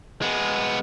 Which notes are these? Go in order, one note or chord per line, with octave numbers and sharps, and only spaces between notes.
G#3 B3